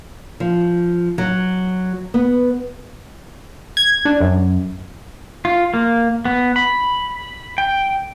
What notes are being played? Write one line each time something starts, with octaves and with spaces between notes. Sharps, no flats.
F3
F#3
B3
G#6
D4
F#2
F4
A#3
B3
B5
G5